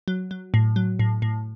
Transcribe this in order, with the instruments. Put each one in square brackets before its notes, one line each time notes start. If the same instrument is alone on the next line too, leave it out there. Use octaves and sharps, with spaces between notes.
[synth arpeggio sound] F#3
F#3
A2
F#3
A2
A2